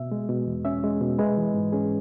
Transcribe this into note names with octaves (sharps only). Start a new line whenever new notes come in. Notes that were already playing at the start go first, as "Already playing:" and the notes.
Already playing: B2 E5
G#3
B2
E2
C#4 E5
G#3
B2
G#3 B4
E3
G#2
C#4 G#4